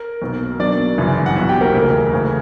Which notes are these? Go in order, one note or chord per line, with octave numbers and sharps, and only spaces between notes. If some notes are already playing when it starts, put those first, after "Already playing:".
Already playing: A#4
B1 B2 A#3
B1 B2 F#3 A#3 D4 D5
G1 F#2 C#3 E3
F#5
B1 B2 F#3 E4 E5
G4 G5
A#3 A#4
E1 D2 C#3
D2 C#3 E3